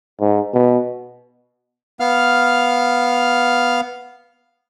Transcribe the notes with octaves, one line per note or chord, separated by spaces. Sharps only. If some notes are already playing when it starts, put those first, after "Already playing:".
G#2
B2
B3 F5 F6